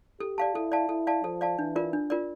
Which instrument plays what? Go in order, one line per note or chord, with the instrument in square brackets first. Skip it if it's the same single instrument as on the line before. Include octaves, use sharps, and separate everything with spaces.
[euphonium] G4 [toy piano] A4
[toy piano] D5 F5 A5
[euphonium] E4 [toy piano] A4
[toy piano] D5 F5 A5
[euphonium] E4 [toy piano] A4
[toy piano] D5 F5 A5
[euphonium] F3 [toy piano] A4
[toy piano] D5 F5 A5
[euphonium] E3 [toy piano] D4
[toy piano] F4 A#4 D5
D4
F4 A#4 D5